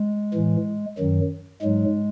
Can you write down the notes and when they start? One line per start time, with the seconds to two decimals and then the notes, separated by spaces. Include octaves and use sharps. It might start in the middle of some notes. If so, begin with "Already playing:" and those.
Already playing: G#3
0.34 A2 E3
0.98 F#2 D#3 F#3
1.62 G#2 F#3 G#3